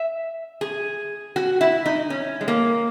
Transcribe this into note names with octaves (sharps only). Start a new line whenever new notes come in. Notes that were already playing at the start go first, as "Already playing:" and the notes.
Already playing: E5
G#4
F#4
E4
D#4
C#4
G#3
A#3